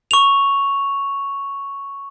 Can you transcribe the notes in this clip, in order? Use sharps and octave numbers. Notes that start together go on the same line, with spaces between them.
C#6 F7